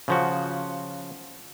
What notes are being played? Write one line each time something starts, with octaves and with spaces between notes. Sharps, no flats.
C#3 F3 F#4